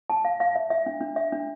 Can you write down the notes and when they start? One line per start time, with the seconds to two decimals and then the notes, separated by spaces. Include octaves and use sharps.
0.10 A5
0.25 F5
0.40 F5
0.56 E5
0.70 E5
0.86 D4
1.01 D4
1.16 E5
1.32 D4